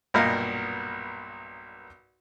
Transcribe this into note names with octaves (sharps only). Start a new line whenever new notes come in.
B1 G2 A#2 A#4 D#5 F5